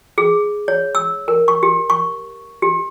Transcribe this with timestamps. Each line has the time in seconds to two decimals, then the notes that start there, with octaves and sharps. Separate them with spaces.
0.18 G#4
0.68 C#5
0.95 E6
1.28 A#4
1.48 C#6
1.63 G4
1.90 C#6
2.62 G4